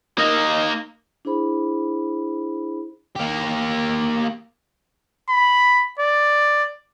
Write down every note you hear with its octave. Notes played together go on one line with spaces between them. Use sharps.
A#3 D#4 D#5
D4 E4 G#4 C5 B5
A#3 G4
B5
D5